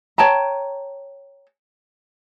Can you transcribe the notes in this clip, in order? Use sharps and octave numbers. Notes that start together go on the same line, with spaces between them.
C#5 G5 A5 A#5